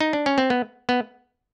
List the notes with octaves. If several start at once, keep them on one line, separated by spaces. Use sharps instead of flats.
D#4
D4
C#4
C4
B3
B3